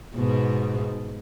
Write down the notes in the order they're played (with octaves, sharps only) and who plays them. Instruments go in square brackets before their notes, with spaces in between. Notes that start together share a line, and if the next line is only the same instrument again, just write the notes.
[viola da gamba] G#2 B2